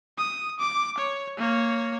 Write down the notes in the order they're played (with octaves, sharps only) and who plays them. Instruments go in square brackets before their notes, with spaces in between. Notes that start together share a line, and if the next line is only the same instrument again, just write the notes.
[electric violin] D#6
D6
C#5
A#3 C#5